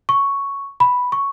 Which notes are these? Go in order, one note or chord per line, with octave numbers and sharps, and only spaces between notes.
C#6
B5
C#6